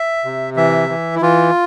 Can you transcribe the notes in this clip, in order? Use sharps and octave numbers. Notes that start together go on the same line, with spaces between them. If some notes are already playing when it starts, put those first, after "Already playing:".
Already playing: E5
C3
E3 E5
E3
E4
E3 F4